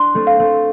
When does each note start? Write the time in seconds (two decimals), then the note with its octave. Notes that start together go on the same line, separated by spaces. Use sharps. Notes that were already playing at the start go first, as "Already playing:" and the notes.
Already playing: D4 C6
0.15 A3 C4
0.27 F5
0.39 A3 C4